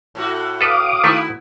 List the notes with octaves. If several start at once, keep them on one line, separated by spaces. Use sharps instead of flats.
A2 A3 F#4
A4 B4 F5 D6 D#6
D#3 A3 B3 E4